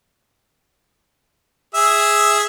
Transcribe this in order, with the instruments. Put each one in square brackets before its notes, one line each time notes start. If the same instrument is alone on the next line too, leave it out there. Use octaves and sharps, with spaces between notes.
[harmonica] G#4 E5